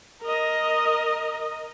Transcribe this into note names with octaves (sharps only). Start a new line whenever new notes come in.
A#4 D#5